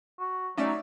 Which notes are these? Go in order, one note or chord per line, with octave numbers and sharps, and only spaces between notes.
F#4
F#3 A3 C#4 D#4 D5 E5